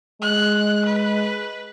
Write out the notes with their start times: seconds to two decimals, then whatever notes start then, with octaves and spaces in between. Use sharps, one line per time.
0.21 G#3 F#6
0.85 B4